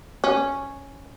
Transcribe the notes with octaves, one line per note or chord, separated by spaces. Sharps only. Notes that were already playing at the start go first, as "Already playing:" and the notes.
C#4